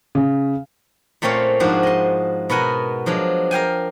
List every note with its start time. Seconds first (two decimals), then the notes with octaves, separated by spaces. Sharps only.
0.15 C#3
1.22 A#2 A3 C4 C#4 C#5 F5
1.60 G#2 F3 D4 F#4 G#4
1.83 D#5 C6
2.50 B2 B3 A#4 F#5 G#5
3.06 F3 F#3 G#3 D4
3.51 A#4 F5 G5 G#5